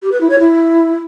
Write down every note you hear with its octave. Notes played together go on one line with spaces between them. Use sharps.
G4
B4
E4
C#5
E4